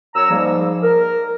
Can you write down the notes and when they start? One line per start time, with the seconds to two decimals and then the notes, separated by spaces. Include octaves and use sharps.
0.15 F#2 F#3 C#5 A#5 E6
0.30 G#2 F3 G3 A#3
0.83 A#4